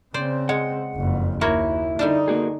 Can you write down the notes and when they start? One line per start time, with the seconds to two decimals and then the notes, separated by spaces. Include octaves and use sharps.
0.14 C#3 C4 C5 D5
0.49 G#3 F#5
0.95 F#1 F2
1.41 D#2 A#3 E4 F#4 C#5
1.99 D3 G3 D4 D#4
2.28 A#3 F#4 G#4